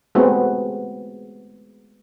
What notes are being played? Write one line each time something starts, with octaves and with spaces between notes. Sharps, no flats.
G#3 A3 B3 C4 F#4